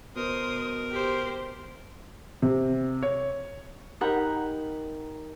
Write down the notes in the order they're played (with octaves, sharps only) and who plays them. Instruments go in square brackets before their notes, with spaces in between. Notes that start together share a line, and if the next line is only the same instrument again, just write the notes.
[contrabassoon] B2 [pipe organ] A#4 [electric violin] C5 D#6
[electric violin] G4 C5
[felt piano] C3
C#5
[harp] D#4 G4 A#4 F#5 A#5 B5